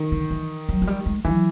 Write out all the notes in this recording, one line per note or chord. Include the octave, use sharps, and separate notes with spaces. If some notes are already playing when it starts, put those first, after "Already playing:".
Already playing: D#3
D3
E3
F#3
F#3
G3
G#3
E3 F#3